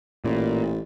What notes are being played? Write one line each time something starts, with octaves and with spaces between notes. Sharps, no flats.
A1 A#2